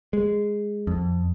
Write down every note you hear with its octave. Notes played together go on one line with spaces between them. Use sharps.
G#3
F2